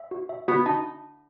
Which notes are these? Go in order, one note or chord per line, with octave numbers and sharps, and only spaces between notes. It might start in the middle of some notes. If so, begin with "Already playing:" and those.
Already playing: E5
F#4
E5
B3 F#4
D#4 A5